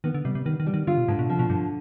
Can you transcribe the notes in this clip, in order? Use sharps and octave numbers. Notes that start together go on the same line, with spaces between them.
D#3 B3
D3
C3 G3
C3
D#3 B3
D#3
G3
D#3
D3 F4
B2
G#2 D3
B2
C3 F3
B2
G2 D3